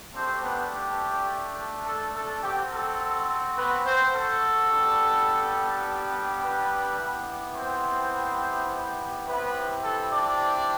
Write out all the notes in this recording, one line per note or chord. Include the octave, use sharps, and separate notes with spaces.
A3 C4 D4 G4 C5
B3 B4
G4
A4
A4
C4 F#4 G4
A4
B3 B4
C4 C5
A4
G3 B3 D4 G4
B3 B4
B3 E4 G4
C4 C5
B3 C4 E4 G4 B4
A4
D4 D5